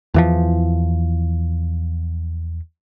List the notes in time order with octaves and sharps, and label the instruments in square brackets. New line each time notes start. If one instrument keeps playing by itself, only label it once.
[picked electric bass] E2 E3 F3